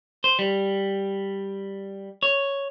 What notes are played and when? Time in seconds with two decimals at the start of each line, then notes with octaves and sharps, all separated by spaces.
0.24 C5
0.39 G3
2.23 C#5